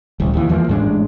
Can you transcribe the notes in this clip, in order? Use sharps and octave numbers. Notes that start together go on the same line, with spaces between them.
D1 C2
D#2 E3
E2 E3 F3 A#3
A1 G#2 G#3 D4